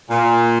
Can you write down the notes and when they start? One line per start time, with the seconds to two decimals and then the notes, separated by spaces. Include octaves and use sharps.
0.10 A#2